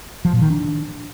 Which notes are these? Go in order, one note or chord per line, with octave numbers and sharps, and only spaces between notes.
F3
A#2
D#3
D4